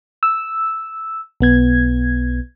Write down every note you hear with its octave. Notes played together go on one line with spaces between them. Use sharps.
E6
B1 B3 G#6